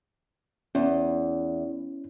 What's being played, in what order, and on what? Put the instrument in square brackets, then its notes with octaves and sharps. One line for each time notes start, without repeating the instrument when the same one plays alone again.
[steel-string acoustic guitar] E2 [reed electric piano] C#4